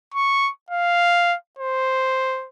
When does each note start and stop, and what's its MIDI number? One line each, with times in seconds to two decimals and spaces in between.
0.14 0.50 85
0.70 1.35 77
1.59 2.47 72